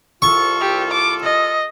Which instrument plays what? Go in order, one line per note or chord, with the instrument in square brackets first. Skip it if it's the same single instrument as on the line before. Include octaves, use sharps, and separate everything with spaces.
[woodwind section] C2 F4 A4 [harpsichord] C#6
[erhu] G4
D6
D#5